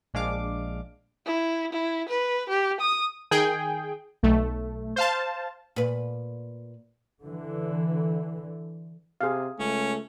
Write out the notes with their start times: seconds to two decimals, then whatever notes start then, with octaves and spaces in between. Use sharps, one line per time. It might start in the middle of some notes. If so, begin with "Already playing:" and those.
0.14 A#1 G#3 D4 F5 D6
1.26 E4
1.73 E4
2.08 B4
2.49 G4
2.80 D#6
3.31 D#3 G#4 G5
4.23 B1 A3
4.96 C5 F5 A5
5.76 A#2 B4
7.24 D3 E3
9.21 C3 G#4 F5
9.59 C#2 A3 C#4